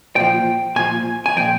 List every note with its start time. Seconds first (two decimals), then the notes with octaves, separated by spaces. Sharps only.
0.16 A#2 F3 G5
0.76 A#2 F3 G#5
1.26 G#5
1.36 A#2 F3 G5